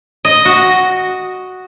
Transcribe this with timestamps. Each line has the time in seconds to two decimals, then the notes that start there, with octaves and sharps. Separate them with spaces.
0.25 D#5
0.45 F#4